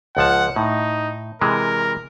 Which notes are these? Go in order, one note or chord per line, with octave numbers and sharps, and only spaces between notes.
C#2 F3 F#5 A5
A2 D#4
C3 E3 G#3 A#4